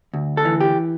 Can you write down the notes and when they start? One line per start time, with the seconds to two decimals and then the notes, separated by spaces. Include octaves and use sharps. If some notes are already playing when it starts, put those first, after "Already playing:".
0.13 D2
0.37 A4
0.45 E3
0.61 G4